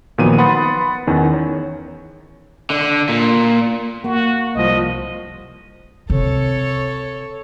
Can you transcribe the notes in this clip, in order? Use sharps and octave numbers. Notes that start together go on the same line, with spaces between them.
A#2 D#3 F3 F#3 B3 D#7
B4 F#5 B5 C6 D#6 A6
E2 D#3 C#4
C#5
D3
A#2
A#3 F#4
C2 F3 D#5
C3 A4 C#5